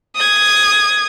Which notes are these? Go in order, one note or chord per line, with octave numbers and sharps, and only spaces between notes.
D#6 G#6